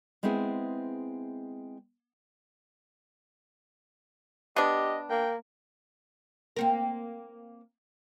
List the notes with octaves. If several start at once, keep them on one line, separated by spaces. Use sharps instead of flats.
G#3 B3 C4 E4 G#4
B3 D4 G4 D#5
A#3 G5
A#3 C4 A#4